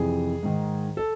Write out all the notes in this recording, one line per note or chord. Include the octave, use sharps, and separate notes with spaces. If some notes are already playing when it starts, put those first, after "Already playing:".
Already playing: F2 C3 E3 G#4
G#2 D#3
A4